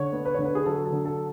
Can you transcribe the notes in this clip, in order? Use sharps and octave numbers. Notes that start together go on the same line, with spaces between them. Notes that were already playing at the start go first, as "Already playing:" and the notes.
Already playing: D3 C#5
B3
B4
D3 C#5
B4
G#4
F#3 A4
A4
D3
A4